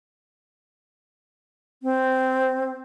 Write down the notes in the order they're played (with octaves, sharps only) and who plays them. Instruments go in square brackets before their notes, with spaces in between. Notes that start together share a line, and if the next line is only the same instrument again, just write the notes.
[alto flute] C4